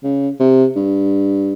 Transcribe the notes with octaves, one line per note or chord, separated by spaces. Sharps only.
C#3
C3
G2